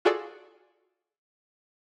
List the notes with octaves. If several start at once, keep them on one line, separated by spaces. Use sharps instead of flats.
F4 F#4 G#4 A4 D5